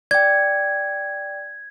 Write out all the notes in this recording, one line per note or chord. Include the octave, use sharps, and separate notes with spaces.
D5 G5 G#6